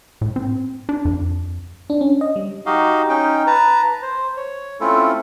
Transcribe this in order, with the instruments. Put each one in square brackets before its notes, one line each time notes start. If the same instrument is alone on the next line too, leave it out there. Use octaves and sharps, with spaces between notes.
[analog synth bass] A2
C4
D4
F2
[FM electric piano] D4
C#4
D#5
G3
[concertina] D#4 F#4 G4 D#5 F5
C#4 D#4 G5
B4 A5 A#5
C5
C#5
A3 C4 C#4 E4 F4 A4